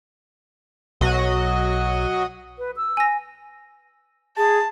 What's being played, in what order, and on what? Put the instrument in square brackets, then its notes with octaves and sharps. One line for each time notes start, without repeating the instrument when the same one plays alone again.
[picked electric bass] B1 [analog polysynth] F#3 F#4 D#5
[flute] B4
E6
[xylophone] G#5 A#6
[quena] G#4 [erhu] A5